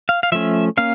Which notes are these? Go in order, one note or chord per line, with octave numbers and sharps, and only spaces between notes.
F5
F5
F3 A3 C#4 E5
A#3 C#4 F5